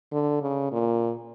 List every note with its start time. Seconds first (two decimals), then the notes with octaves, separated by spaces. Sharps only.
0.12 D3
0.42 C#3
0.72 A#2